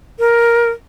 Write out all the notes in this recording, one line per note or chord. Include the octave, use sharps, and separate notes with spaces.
A#4